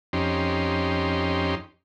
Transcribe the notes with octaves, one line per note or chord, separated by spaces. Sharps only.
F2 C#4 D#4 G4 C6